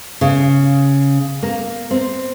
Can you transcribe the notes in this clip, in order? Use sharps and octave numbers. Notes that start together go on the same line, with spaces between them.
C#3
A#3
C4